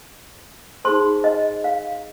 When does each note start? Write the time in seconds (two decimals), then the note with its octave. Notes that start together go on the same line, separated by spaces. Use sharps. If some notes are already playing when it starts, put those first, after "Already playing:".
0.85 D#4 G#4 C5 C6
1.24 D#5
1.64 F5